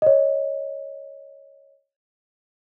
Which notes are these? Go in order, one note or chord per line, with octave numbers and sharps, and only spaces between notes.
C#5 D#5